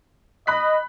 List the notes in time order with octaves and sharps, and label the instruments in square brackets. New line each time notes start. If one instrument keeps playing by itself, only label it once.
[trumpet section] D#5 [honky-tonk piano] B5 F#6 B6